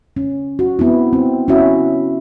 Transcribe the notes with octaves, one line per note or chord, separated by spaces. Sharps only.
C#4
F#4
B3 C4 E4
C4
C#4 E4 F#4 E5